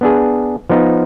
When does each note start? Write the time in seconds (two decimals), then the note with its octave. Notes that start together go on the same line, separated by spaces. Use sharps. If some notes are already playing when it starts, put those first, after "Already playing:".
0.01 B3 D4 G#4
0.69 F3 B3 D#4